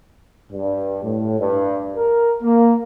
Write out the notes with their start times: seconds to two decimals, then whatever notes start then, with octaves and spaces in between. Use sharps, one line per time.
0.53 G2
1.04 A2
1.40 G2
1.96 A#4
2.43 A#3